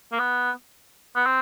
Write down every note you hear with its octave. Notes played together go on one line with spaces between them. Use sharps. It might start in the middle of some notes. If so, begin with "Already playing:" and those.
A#3
B3
B3
C4